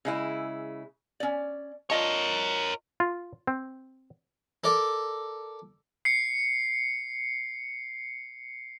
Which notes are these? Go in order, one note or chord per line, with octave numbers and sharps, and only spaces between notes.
C#3 G#3 E4
C#4 D5
F4 A#4 C#5 D#5 A5
F4
C4
A4 A#4 D5
C7 C#7